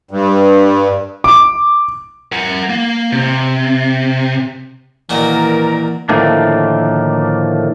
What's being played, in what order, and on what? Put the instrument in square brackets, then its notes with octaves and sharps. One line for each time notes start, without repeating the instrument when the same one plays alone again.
[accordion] G2
[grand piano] D6
[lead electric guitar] A#4 F#5
A#3
C3
[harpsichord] A#2 D#3 F#4 [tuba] E3 [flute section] A#4 D5 A#5
[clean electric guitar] A2 D3 D#3 F3 A3 A#3